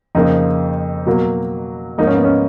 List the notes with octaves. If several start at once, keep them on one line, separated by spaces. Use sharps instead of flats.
F2 C#3 F3 A#3 D#4
B2 F#3 A#3
G#2 F3 A#3 D#4
C#4
B3
C#4